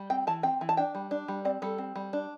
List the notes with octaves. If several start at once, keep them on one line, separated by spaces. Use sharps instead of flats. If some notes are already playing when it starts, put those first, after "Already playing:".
Already playing: G3
C4 G5
E3 A5
C4 G5
E3
A5
D4 G5
G3
D4
G3
C4 D5
G3 A4
C4
G3
D4